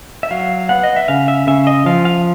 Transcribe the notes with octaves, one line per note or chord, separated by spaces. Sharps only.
E5
F#3 F5
B3 F#5
D#5
E5
C#3 F5
E5
C#3 E5
D#5
F3 F5
F5